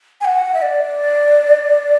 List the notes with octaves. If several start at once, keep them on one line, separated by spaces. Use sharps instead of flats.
G#5
F#5
E5
D5